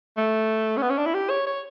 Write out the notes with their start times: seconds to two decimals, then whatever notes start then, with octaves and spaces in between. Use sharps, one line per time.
0.17 A3
0.77 C#4
0.82 B3
0.90 C#4
0.98 D4
1.06 E4
1.14 G4
1.30 C#5
1.46 C#5